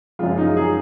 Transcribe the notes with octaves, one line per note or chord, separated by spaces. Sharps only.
F#2 C#3 F3 G#3 F4
D#4
G#4